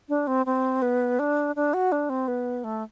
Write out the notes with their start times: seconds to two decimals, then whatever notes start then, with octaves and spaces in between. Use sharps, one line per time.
0.09 D4
0.27 C4
0.46 C4
0.82 B3
1.19 D4
1.56 D4
1.74 F#4
1.92 D4
2.10 C4
2.28 B3
2.64 A3